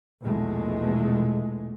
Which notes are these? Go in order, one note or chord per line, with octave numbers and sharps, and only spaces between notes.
A#1 E2 B2 G#3 A3